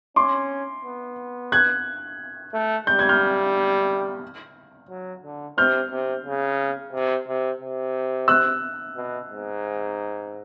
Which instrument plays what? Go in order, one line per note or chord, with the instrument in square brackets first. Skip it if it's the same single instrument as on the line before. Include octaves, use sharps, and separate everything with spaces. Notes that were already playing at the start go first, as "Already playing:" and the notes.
[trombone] C#4 [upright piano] C6 D6
[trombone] B3
[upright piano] F#6 G#6
[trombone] A3
[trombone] G3 [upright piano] G6
[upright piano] G#6
F6 G6
[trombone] F#3
D3
[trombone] C3 [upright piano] F6 G6
[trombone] C3
C#3
C3
C3
C3
[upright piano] E6 F#6
[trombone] B2
G#2